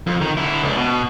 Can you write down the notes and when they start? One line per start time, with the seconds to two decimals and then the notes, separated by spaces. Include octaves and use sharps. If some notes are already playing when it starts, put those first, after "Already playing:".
0.07 F2
0.21 D#3
0.37 D3 E4
0.62 C#2 D4
0.76 B2